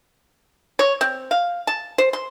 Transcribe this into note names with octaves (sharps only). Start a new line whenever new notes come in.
C#5
C4
F5
A5
C5
C6